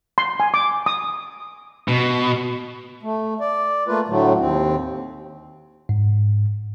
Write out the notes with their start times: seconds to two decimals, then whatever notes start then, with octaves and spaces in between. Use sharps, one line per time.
0.18 C6
0.40 G#5
0.54 D6
0.86 D#6
1.88 B2
3.03 A3
3.41 D5
3.87 A3 A#3 F4 B4
4.08 A2 D3 F#3 A3
4.38 D#2 C4
5.89 G#2